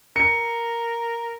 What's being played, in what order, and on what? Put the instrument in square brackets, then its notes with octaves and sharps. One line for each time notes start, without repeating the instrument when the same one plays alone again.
[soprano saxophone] A#4 [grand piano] C#7